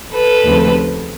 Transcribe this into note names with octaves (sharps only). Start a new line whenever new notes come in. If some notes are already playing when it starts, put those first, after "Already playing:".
A4 B4
D#2 C#3 F3 A3 C4